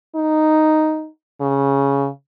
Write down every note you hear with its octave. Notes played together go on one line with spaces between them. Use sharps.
D#4
C#3